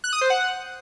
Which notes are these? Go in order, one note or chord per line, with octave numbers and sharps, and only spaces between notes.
F#6
D#6
C5
F#5